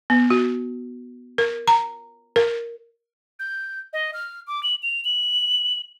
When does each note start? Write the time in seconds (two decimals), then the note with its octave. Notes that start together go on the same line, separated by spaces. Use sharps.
0.10 B3
0.30 F#4
1.38 A#4
1.68 A#5
2.36 A#4
3.39 G6
3.93 D#5
4.14 F6
4.47 D6
4.63 F#7
4.83 F7
5.05 F#7